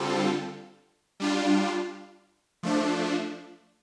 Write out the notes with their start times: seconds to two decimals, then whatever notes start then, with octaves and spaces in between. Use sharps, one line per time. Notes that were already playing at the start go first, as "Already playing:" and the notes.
Already playing: D3 G3 C4 F4 A4
1.20 G3 D4 F4
2.63 F3 A3 D4